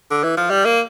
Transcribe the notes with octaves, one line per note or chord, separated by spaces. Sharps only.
D3
E3
F3
G3
A#3